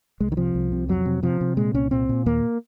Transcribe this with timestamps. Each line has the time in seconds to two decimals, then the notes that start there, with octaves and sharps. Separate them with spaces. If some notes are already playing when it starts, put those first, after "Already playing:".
0.20 C2 G#3
0.32 D#3
0.37 C3 F3
0.55 C2
0.72 C3
0.89 F2 F#3
1.06 C3
1.23 C3 F3
1.41 C3
1.57 A#2 G#3
1.74 C2 C#4
1.91 A#2 C4
2.09 A#2
2.26 D#2 A#3